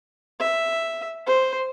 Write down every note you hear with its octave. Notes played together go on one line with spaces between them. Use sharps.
E5
C5